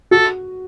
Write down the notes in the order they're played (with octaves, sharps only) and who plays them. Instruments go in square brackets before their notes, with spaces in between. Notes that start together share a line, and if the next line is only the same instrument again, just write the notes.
[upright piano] F#4 [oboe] A4